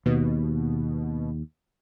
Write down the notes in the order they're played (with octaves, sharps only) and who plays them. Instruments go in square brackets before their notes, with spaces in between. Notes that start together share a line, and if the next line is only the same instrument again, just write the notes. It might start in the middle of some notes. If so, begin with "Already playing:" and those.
[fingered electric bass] D#2 [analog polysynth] B2